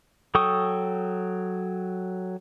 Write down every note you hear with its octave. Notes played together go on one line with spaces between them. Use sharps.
F#3 A4 G5 C#6 D#6